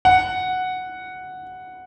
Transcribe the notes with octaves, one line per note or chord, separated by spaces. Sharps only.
F#5